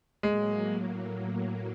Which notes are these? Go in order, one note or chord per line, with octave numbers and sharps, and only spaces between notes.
A2 F#3 G#3 A#3